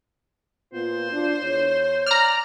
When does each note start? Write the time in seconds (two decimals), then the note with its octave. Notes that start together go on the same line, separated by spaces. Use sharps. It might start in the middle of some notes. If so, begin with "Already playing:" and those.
0.73 A#2 B3 F4 C5
1.12 D4 F4
1.43 E2 C#5
2.06 D5 A#5 F6